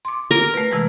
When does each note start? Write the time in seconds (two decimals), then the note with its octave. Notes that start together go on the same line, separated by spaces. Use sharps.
0.05 C6 D6
0.31 A#4
0.54 A3 B4
0.72 C3 E3 G#3